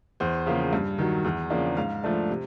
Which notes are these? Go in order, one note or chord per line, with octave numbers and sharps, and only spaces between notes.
E2 C5
C#3 F3 A#3
G2
D#3 F#3
E2
C#3 F3 A#3 D4
G#2 F5
F3 A3 D4
C3